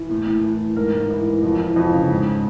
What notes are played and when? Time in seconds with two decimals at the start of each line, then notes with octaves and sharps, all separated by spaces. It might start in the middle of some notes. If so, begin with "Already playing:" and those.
Already playing: E3
0.10 A2
0.27 A2
0.44 E3
0.59 E3
0.76 G#2 A#4
0.93 G#2
1.10 E3
1.27 E3
1.43 F2
1.59 E3
1.76 F2
1.94 C#3
2.09 G#2